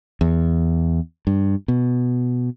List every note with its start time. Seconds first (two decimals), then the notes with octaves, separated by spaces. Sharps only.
0.21 E2
1.27 G2
1.68 B2